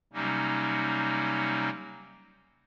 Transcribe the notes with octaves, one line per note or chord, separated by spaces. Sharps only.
C3 F#3 G3 A#3 C#4 D#4